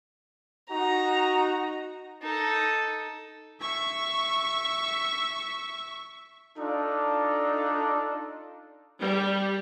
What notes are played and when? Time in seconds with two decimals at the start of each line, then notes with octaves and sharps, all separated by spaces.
0.70 D#4 F#4 A#5
2.22 D#4 A4
3.61 E5 C#6
6.58 D4 D#4 F4 A4 D5
9.01 G3